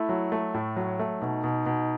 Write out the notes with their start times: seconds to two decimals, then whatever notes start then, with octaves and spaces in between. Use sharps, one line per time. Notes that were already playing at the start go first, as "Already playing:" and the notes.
Already playing: A3 E4
0.09 F#3
0.32 A3
0.54 A2
0.76 F#3
0.99 A3
1.21 B2 D#4
1.44 B2
1.66 B2